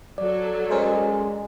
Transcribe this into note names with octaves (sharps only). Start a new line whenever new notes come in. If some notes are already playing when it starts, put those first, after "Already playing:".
F#3 A4 D5
G#3 C#4 A#4 C5